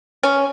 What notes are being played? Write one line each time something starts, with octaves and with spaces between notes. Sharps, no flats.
C#4